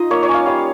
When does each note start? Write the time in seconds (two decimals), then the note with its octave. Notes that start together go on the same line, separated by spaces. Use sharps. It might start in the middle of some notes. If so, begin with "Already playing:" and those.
Already playing: D#4 F4 D#5
0.11 A#3 C#5
0.23 C#5
0.28 C#4
0.34 F5
0.46 G3 F5